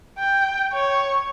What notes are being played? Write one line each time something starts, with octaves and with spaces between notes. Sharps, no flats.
G5
C#5